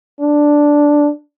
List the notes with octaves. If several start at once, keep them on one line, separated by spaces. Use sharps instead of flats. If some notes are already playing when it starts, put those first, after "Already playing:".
D4